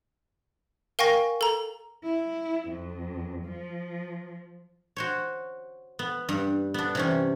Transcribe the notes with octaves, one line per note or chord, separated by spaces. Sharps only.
A#4 F5 G5 G#5 C#6 A#6
A4 A#5
E4
F2
F3
F#4 C5 C#5
B3
G2
B3 D4
C3 E3 C#4